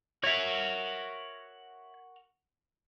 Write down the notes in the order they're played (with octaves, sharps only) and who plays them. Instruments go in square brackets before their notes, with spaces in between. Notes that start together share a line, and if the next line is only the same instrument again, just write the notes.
[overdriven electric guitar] F#4 A#4 [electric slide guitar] C#5 E5